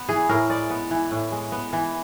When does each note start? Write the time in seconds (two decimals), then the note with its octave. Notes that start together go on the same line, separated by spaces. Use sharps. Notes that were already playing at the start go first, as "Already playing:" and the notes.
Already playing: B3
0.09 E3 G#4
0.29 A2 A#4
0.50 G#3 D5
0.70 B3
0.91 E3
1.11 A2
1.32 G#3
1.52 B3
1.73 E3